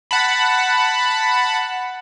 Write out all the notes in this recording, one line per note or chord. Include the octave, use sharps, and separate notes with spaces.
F#5 A5 B5